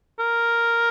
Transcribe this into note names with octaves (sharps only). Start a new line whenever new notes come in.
A#4